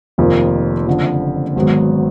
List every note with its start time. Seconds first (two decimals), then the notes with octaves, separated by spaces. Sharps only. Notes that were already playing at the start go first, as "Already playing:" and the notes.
0.18 F1 F2 D#3 A#3
0.87 F#1 F2 D3
1.56 G#1 G#2 F#3 B3